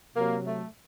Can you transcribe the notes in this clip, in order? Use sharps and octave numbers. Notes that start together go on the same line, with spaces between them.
C3 F#3 A#3
A3